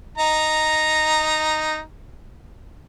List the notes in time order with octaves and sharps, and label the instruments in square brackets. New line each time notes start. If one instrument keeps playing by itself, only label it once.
[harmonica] D#4 A#5